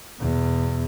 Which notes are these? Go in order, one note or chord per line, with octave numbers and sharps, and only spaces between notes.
E2 B2